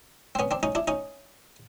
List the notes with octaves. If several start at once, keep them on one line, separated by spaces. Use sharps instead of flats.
C4
B3 C#4
C4 D4
C#4 D#4
D4 E4
C#4 D#4